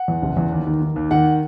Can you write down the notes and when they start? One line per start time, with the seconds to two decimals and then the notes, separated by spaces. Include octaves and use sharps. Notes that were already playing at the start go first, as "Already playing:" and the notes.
Already playing: F#5
0.08 E2
0.22 F#1
0.37 E2
0.52 D#2
0.67 D#3
0.82 D#3
0.96 D#2
1.11 D#3 F#5